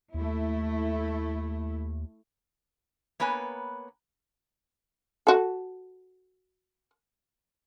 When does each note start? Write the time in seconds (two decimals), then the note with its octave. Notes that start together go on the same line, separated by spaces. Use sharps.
0.14 D#2 A3 E4
3.20 A#3 B3 B4 C#5 G#5
5.27 F#4 A4